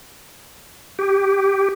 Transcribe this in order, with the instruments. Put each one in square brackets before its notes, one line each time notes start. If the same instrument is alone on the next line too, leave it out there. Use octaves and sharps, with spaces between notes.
[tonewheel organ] G4